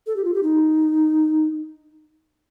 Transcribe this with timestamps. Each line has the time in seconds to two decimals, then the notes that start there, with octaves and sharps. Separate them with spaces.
0.07 A4
0.16 G4
0.24 F4
0.34 G4
0.43 D#4